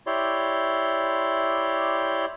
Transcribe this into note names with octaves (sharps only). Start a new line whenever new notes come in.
E4 G4 C#5 D5 C6